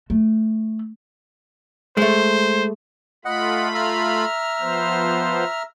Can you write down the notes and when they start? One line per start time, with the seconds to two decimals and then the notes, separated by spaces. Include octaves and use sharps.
0.10 A3
1.97 G#3 A3 C5
3.25 A3 F4 D#5 F#5 B5
3.75 E5 A#5 F6
4.61 F3 B3 C5